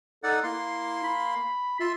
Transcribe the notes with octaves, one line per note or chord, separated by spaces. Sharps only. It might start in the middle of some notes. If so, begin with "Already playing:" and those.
D#4 A4 D5 F#5
A#3 E4 C6
B5
F4 E5 C6